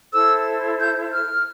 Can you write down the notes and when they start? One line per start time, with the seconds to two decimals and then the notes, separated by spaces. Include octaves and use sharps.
0.13 E4 A4 C5 E6
0.80 G6
1.13 F6